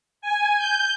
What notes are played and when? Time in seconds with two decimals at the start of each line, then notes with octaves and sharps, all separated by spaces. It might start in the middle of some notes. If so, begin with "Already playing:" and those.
0.21 G#5
0.57 G6